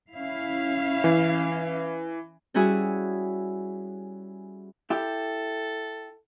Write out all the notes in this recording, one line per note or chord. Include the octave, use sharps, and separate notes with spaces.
C#4 E4 F5
E3
G3 C#4 E4 F#4 G#4
E4 G4 A4